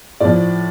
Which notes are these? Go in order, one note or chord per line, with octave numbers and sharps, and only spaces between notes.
A2 F3 D5